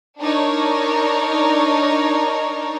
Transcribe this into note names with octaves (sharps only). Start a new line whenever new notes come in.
D4 D#4 A#4 C#5